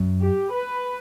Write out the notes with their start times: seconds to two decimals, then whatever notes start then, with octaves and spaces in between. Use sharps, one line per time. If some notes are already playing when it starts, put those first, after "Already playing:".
Already playing: F#2
0.21 G4
0.53 B4